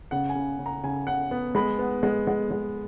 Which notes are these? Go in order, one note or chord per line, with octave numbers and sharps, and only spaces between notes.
C#3 F#5
G#5
C#3
C#3
A#5
C#3 G#5
C#3 F#5
B3
G#3 B5
B3
G#3
G#3
G#3